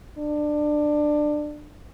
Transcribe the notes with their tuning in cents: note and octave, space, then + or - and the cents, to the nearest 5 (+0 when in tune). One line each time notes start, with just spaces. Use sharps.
D4 +20